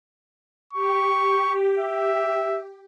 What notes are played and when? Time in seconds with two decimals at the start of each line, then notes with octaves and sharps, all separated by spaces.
0.73 G4 C#6
1.79 E5